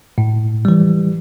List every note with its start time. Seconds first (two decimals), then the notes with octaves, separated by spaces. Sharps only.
0.18 A2
0.65 E3 G3